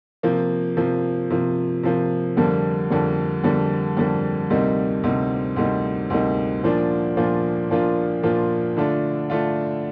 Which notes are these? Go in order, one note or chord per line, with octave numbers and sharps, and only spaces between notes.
C3 F3 A#3
C3 F3 A#3
C3 F3 A#3
C3 F3 A#3
F2 D3 G3 A#3
F2 D3 G3 A#3
F2 D3 G3 A#3
F2 D3 G3 A#3
D2 C3 G3 A#3 D#4
D2 C3 G3 A#3 D#4
D2 C3 G3 A#3 D#4
D2 C3 G3 A#3 D#4
A#2 F3 A#3 D4 F4
A#2 F3 A#3 D4 F4
A#2 F3 A#3 D4 F4
A#2 F3 A#3 D4 F4
D3 A3 D4 F4
D3 A3 D4 F4